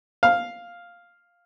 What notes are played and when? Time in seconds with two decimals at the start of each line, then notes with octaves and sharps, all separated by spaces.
0.23 F5